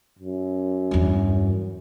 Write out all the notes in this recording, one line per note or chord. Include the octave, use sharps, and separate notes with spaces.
F#2
E2 G2